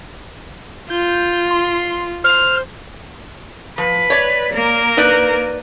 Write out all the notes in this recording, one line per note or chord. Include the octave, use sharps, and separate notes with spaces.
F4 G6
C6
C5 F6
F3 B4
C#5 D5
A#3 A#4
D#4 B4 D5